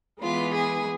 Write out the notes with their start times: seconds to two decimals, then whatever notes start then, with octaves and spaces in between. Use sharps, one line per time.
0.22 E3 G#3 B3 F4
0.55 G#4